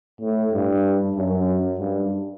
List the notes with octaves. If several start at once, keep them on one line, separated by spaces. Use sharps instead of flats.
A2
G2
F#2
G2